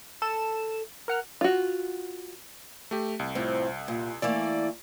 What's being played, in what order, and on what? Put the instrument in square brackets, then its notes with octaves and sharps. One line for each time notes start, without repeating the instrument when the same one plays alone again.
[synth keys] A4 E7
A#4 F#5 F6
[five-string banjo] F4 F#4
[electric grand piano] A3 G4
C2
[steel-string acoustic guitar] F2 A2 C4
A#2
[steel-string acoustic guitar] E3 A3 A#3 [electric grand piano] D5